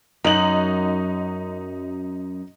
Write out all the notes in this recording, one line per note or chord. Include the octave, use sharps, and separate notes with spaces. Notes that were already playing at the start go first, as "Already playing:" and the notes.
F#2 D#4 F#7